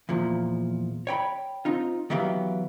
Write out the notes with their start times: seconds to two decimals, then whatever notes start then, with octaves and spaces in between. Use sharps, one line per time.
0.09 E2 A#2 F3
1.07 C#5 G5 B5
1.65 C4 D#4 F4
2.10 D#3 E3 F#3 B3 G4 F5